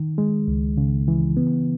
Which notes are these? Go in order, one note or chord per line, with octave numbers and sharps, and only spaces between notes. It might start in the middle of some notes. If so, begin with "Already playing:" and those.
Already playing: D#3
G#3
C#2
C#3
E3
B3